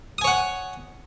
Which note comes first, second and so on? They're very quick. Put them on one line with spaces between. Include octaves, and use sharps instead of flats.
D#6 G#5 C#5 F#5